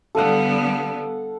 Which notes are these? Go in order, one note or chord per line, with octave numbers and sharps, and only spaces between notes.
D3 G3 B3 A4 F5 F#5